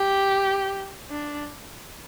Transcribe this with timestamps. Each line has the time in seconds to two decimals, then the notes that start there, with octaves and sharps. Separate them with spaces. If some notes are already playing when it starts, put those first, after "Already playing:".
Already playing: G4
1.11 D4